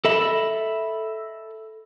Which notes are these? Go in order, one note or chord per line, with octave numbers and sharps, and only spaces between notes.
A4 D#5 E5 B5